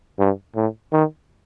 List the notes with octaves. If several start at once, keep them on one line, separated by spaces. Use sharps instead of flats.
G2
A2
D#3